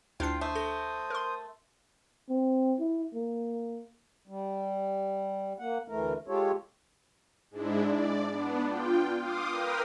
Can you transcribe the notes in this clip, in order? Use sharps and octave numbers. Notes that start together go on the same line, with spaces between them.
D2 D4 E4 F4 G5 C7
A3 C5 D#6
A4 G6 A#6
A#4 C6
C4
E4
A#3
G3
A#3 F#5
D2 E3 A3 A#4
G#3 F4 G4 A4 C#5
G#2 G#3 D4 E4
D5
B3 D4
F4 G5
F5 C6 D6 D#6
A#4 B4 G5 D#6 F6